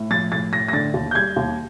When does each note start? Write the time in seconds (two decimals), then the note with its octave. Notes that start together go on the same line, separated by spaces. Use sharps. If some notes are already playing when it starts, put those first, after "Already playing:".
Already playing: A2
0.10 F3 A6
0.32 A2 A6
0.53 A2 A#6
0.68 A#6
0.73 D3 A6
0.94 D#2
1.11 G6
1.15 G3 G#6
1.36 D#2